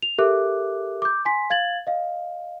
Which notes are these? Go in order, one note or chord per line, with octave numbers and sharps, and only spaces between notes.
F7
G4 A4 A#4 E5 D6 F#6
D6 G6
G#5 C6 B6
F5 G#6 A6 F#7
D#5 F5